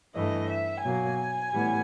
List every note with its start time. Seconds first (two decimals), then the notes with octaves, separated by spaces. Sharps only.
0.14 G2 E3 A3 D#5
0.49 E5
0.83 B2 F#3 A#3 G#5
1.52 A2 E3 G3 B3